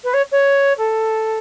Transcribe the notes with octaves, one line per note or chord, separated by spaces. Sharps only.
B4
C#5
C#5
A4